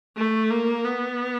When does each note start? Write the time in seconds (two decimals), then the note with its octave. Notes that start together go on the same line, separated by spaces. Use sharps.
0.17 A3
0.50 A#3
0.85 B3